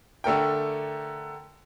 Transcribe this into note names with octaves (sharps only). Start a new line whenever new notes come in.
D3 A3 A#4 G5